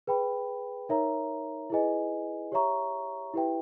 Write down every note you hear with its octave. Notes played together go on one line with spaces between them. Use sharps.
G#4 B4 G5 B5
D#4 A#4 C#5 E5 A#5
E4 G#4 B4 D#5 G#5
G4 C#5 E5 A#5 C#6
E4 G4 B4 E5 G5